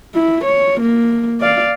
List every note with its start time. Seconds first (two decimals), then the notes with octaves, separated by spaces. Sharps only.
0.15 E4
0.44 C#5
0.81 A#3
1.41 D5 F5